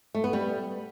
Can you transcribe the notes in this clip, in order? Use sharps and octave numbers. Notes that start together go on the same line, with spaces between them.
A3
B3
G3